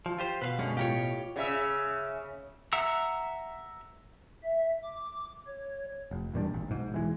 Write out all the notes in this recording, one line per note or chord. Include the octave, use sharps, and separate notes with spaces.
F3
F4 G4 C5
B2 B4 C5 F5
F#2 D3 G#3 C#4
A2 F4 G4 A#4 C#5 F5
C#3 E5
E5 F#5 A#5 E6
E5
D6
C#5
F1
E2 A#2 G3 D4
G#1
B1 G#2
E1 E3 G#3